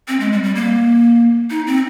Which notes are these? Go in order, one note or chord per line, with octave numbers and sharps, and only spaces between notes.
C4
G#3
G3
G3
A#3
D#4
C4